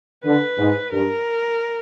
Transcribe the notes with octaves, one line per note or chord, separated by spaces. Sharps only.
D3 B4
G#2
G2 A#4